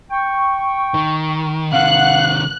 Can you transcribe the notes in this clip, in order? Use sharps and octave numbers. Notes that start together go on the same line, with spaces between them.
G5 C#6
D#3
C3 D#3 F5 F#5 F#6